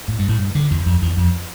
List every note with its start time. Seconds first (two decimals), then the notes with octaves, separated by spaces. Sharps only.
0.08 A2
0.19 G2
0.29 A2
0.39 G2
0.55 D3
0.71 E2
0.86 F2
1.02 E2
1.17 F2